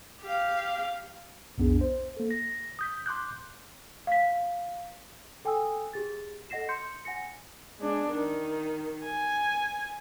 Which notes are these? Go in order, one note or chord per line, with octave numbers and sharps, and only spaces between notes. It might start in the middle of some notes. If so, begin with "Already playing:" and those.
G4 F5
B1 F2 B3 D4 G#4
C5
A#3 A4
A#6
D#6 G6 B6
C6 D6 F#6 G6
F5 B6
A4 G5 G#5 D#6 E6
G4 G#4 A6
A4 D#5 F#5 A#6 C7 E7
C6 G6 C#7
F#5 G#5 A#6 C#7
G#3 D4
D#3
G#5